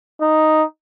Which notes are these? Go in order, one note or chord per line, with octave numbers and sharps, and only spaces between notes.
D#4